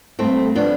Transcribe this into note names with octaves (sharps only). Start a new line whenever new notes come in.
G2 A3 C4
F3 B3 D4